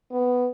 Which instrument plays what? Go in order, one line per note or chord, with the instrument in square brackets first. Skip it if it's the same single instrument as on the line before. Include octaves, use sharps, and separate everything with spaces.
[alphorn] B3